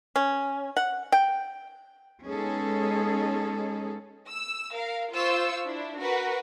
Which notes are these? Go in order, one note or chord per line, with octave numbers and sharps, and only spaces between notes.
C#4
F#5
G5
G#3 B3 C#4 D#4 G#4 A4
E6
A#4 F5
F4 C5 C#6 E6
D4 E4
F#4 A#4 B4